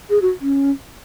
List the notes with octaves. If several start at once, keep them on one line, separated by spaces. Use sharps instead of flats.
G#4
F#4
C#4